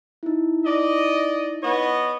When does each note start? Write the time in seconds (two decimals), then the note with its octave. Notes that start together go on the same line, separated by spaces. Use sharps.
0.23 D#4 E4
0.65 D5 D#5
1.63 B3 C#5 D#5